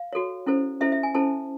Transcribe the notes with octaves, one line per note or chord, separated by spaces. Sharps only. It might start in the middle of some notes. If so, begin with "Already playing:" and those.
Already playing: F5
F#4 A4 C#5
C#4 E4 A4 C5
C#4 E4 A4 C5 E5
E5
G#5
C#4 E4 A4 C5 A5